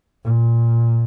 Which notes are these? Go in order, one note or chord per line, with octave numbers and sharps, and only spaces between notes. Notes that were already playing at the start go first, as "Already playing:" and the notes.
A#2